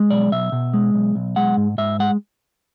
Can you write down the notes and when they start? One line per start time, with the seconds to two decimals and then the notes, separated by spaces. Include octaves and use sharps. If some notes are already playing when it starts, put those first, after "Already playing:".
Already playing: G#3
0.10 B1 D5
0.32 B1 E5
0.52 B2
0.74 G#3
0.94 B1
1.15 B1
1.36 G#3 F#5
1.57 G#2
1.78 G#2 E5
2.00 G#3 F#5